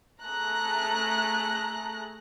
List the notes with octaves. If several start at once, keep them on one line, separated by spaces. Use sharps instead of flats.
A3 G#4 A#5 F#6